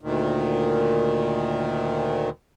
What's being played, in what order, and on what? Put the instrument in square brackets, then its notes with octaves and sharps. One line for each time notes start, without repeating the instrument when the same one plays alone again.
[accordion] D2 A#2 D#3